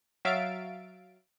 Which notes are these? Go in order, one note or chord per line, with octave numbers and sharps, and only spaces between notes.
F#3 E5 F5 A6 D7